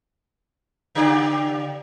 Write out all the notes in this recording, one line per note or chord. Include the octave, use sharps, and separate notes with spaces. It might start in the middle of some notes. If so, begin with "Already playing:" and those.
C#3 G4 D5